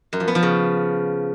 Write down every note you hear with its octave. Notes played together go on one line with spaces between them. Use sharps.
F#2
F3
B3
F3
C#3